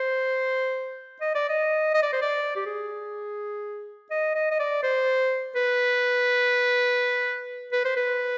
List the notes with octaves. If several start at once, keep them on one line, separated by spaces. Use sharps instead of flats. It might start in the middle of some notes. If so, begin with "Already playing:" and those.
Already playing: C5
D#5
D5
D#5
D#5
D5
C5
D5
G4
G#4
D#5
D#5
D#5
D5
C5
B4
B4
C5
B4